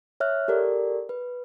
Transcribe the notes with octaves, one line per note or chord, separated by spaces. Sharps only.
C#5 E5 F6 F#6
G4 A4 A#4 D5
B4